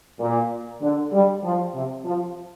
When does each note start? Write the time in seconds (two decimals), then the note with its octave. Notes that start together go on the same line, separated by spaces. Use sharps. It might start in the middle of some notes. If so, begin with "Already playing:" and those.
0.20 A#2
0.82 D3
1.13 G3
1.44 F3
1.75 C3
2.05 F3